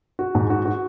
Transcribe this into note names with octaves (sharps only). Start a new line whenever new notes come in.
F#4
G#2
F#4
F#4